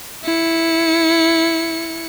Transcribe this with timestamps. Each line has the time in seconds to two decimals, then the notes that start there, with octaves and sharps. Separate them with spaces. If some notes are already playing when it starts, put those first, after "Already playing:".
0.24 E4 C#7